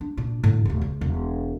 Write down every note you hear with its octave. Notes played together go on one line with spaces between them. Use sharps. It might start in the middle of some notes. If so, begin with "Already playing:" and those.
D4
A#2 D4
A2 D3
D#1 A3
C#2
E1